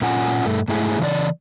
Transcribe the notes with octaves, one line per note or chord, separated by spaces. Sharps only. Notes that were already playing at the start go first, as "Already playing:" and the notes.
A#2 C#4 F4 F#5 G#5
G2 A3
G#2 A3 E4 G#4
C#3 E3 D5